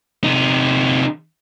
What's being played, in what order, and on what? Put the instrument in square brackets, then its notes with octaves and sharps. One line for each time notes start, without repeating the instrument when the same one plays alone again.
[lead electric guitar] C3 D#4